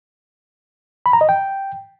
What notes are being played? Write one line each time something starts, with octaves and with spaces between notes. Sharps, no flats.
B5
A#5
D#5
G5